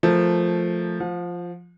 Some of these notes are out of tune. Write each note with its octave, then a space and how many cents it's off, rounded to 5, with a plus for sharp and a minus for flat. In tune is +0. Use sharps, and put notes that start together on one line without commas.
F3 +0 A3 -5 A#4 +0
F3 +0 F5 +45